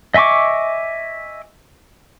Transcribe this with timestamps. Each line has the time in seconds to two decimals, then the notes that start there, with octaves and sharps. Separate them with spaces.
0.14 D#5 E5 G#5 C#6 D6